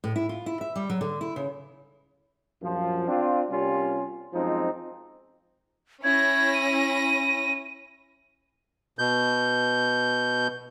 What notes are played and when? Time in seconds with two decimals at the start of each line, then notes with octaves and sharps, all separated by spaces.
0.04 A2
0.16 E4
0.29 F4
0.46 E4
0.61 E5
0.76 G3
0.90 F#3
1.01 D3
1.21 E4
1.36 C#3
2.62 A#1 F#2 F3
3.08 C4 D4 F4
3.50 C3 G3 A#3 C#4 F4
4.34 F#2 F3 G#3 C4 D#4
6.04 C#4 E4 G#6 A#6
6.54 D#7
8.99 B2 G6